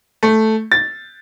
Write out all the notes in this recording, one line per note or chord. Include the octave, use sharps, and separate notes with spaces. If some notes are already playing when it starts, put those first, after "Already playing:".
A3
A6